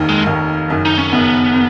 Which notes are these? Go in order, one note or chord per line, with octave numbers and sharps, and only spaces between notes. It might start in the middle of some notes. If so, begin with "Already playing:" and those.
Already playing: F1 D#2 D#3
G#3
F1 D#2 D#3
F#1 F#2 D#3
D#4
C#4
F#1 F#2 D#3 B3